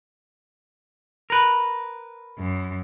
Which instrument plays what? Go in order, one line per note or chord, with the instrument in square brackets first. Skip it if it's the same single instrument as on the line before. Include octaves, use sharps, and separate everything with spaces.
[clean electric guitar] A#4 B4
[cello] F#2